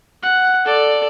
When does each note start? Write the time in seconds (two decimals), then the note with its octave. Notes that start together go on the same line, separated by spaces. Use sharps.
0.23 F#5
0.65 A4 D5